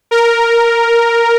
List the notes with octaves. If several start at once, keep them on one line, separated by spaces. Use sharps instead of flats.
A#4